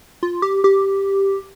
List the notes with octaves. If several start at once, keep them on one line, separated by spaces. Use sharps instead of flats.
F4
G4
G4